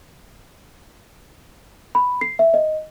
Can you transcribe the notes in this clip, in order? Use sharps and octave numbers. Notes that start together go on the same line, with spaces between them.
B5
C7
E5
D#5